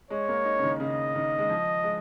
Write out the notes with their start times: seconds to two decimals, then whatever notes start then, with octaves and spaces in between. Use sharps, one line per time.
0.10 G#3 C#5
0.29 A#3
0.45 D#4
0.59 C#3
0.63 D#3
0.80 C#3 D#5
1.16 D#3
1.39 G#3
1.49 F3
1.84 G#3